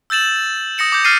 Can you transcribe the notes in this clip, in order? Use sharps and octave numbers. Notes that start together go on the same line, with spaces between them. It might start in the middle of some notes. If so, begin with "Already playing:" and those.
E6 G6 A6 E7 F#7
D#6 A#6 C#7 E7
D6 G6
F6 A6 C7 D#7